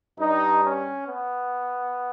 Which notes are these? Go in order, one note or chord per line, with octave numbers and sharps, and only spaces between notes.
G2 G3 D#4
C#4
B3